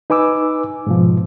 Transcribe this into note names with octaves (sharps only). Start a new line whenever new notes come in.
D#4 B4 G#5 D6 E6
G#2 B2 F3